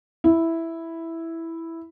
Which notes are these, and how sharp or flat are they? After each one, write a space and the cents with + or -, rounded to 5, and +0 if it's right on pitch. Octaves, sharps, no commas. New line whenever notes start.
E4 +0